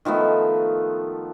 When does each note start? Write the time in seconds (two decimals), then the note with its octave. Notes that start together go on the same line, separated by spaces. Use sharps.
0.05 D#3 F3 A3 B3